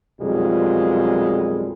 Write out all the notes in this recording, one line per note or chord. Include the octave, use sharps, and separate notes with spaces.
B1 F2 A#2 G3 G#3